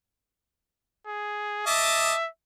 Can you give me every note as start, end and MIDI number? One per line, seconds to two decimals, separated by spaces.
1.07 1.62 68
1.66 2.13 75
1.66 2.28 76
1.66 2.13 81
1.66 2.13 86